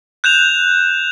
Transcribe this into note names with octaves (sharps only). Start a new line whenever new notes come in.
F#6 G6 E7 F7